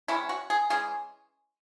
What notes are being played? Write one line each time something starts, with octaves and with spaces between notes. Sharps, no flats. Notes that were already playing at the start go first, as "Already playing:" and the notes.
C3 D#3 G#3 C#4 E4
F#4
G#4
E3 G#3 C#4 G#4